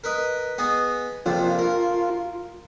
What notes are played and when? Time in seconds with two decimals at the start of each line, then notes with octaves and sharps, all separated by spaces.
0.04 A#4 B4 D#5
0.58 B3 G#4 D#5
1.26 A#1 F2 C3 F4
1.59 A#4